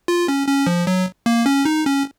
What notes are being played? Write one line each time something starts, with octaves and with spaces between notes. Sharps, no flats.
F4
C#4
C#4
F3
F#3
A#3
C#4
D#4
C#4